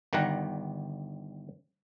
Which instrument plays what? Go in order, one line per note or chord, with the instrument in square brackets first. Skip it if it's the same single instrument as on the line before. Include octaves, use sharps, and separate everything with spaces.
[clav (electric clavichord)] G1 D#3 G3 F#5 A#5